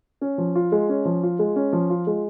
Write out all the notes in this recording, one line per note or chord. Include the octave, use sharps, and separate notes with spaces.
C#4
F3
F4
G#3
C#4
F3
F4
G#3
C#4
F3
F4
G#3